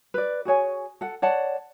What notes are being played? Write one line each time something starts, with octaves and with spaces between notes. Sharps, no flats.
B4 D5
F#4 G#4 C#5 G#5
A4 F#5
C#5 D5 F#5 A5